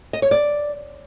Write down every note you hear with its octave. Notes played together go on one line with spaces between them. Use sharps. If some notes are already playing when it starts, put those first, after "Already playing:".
D#5
C#5
D5